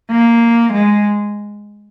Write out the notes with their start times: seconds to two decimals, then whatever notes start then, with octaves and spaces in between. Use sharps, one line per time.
0.10 A#3
0.73 G#3